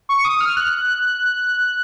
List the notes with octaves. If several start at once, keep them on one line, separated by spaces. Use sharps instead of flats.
C#6
D#6
F6
F#6